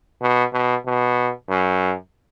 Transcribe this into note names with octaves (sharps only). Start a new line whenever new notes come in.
B2
B2
B2
F#2